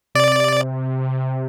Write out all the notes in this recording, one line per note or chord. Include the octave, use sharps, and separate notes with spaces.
C3 D5